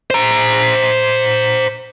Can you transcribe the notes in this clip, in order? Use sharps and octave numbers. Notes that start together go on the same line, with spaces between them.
C5 A#5